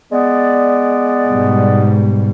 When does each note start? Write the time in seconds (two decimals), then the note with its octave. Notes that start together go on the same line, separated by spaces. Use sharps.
0.12 G#3 B3 D5
1.28 G#2 B2 G3